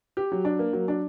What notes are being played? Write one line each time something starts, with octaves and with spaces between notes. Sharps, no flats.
G4
F#3
D4
A#3
F#3
D4